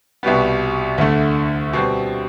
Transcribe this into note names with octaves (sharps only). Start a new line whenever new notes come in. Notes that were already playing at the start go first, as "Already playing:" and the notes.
C2 B2 G3 B3
D2 D3 A3
B2 G3 C4